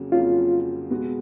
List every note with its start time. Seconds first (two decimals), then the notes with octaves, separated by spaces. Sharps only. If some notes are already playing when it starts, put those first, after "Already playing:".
Already playing: F2 C#3 F#3 A#3 C#4
0.12 F2 C#3 F#3 A#3 C#4 F4
0.90 B2 G#3 B3 F#4